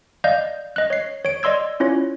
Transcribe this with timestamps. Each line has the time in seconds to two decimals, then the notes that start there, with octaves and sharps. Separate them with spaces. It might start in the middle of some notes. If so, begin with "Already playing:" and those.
0.24 D5 D#5 F5 G6
0.76 D#5 F#6
0.90 C#5 C7
1.25 C#5 D7
1.43 D5 D#5 C6 E6 G#6
1.80 C#4 E4 F4 C#5